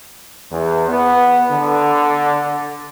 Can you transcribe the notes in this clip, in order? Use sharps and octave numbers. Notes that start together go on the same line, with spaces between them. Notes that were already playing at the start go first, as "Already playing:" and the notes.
E2
B3
D3